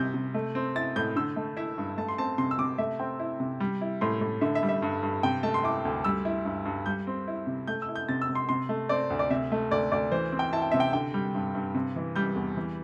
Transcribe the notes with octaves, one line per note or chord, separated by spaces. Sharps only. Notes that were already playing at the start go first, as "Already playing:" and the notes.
Already playing: C3 G3 E4 G6
C3
A3
C4
E4 A6
A2 G6
D3 E6
A3
E4 E5
G2
A3 A5
C6
C4 A5
C3 C6
E6
C3 D6
A3 E5
C4 G5
E4
C3
G3
E4
A2 C6
A2
D3 E5
E5
G3
E5
G2
G2
C3 G5
A3 A5
C6
E4 D6
D2
G3 E6
E4
G2
G2
G3 G6
C4
E4
C3
A3 G6
E6
E4
G6
C3 A6
E6
C3
C6
C3 C6
A3
C4 D5
D2
D5
C3 E5
A3
D2 D5
D2 D5
E3 C5
C4
G5
E4 A5
G5
C3 E5
G5
D3 G5
G3
G2
G2
C3
E3
G3 G6
E2
E3